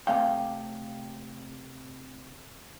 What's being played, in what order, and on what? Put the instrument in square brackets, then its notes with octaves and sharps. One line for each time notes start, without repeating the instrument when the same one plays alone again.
[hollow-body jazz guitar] C3 A3 F5 G5